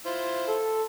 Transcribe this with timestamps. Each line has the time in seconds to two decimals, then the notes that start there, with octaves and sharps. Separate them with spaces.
0.05 E4 F4 C5
0.48 A4